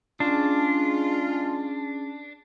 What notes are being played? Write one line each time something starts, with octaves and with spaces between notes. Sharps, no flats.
G#3 C#4 D4 F4 G#4 A5